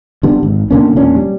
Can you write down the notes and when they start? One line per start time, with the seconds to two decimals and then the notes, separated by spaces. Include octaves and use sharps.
0.23 D3 G3 B3
0.43 G#1
0.71 B2 D3 A#3 C#4
0.96 E1 A#2 C#4 D4
1.16 G3